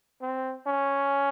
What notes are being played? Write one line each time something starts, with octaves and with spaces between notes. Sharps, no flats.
C4
C#4